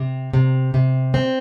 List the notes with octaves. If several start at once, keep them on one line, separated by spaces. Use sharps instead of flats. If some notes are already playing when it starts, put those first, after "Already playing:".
Already playing: C3
C3
C3
C4